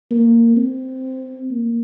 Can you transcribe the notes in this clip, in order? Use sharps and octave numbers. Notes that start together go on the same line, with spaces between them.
A#3
C4
A#3